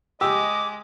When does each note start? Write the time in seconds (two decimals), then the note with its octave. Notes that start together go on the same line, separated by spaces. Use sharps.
0.21 G#3 G4 D#5 D6 E6